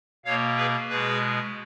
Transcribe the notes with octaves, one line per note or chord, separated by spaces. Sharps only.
B2 A#3 C#5 F5
G#4 B4
B2 G#3 G#4 B4